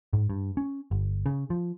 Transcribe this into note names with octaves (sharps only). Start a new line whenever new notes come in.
G#2
G2
C#4
G1
C#3
F3